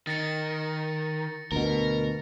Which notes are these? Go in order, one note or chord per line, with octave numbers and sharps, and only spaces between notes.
D#3 A6 A#6 C#7
D2 B2 A#4